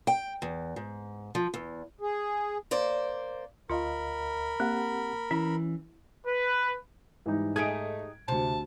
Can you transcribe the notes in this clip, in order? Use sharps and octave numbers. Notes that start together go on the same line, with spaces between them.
G5
E2
G#2
F3
E2
G#4
A#3 C5 D5
D2 F4 A#4 D#5 F5 B5
A#3 C4 G4 F#5
E3 C#4 E4
B4
G#2 E3 G3 D#4
A3 D#4 G4 G#4 G#6 D7
D2 C3 C5 A5